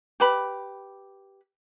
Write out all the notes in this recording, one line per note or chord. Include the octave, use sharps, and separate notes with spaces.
G4 B4 B5